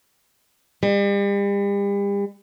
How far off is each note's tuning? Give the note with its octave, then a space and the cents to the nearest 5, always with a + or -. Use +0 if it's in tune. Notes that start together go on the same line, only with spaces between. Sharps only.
G3 +40